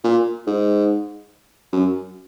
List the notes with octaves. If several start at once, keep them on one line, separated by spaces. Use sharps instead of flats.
A#2
G#2
F#2